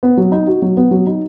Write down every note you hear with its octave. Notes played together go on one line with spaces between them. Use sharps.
B3
F#3
D#4
F#4
F#3
B3
F#3
D#4